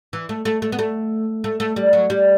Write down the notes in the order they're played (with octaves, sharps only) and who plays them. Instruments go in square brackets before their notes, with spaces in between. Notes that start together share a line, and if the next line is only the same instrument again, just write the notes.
[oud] E3
A3
A3
A3
B3
A3
A3
A3
G3
F#3
G3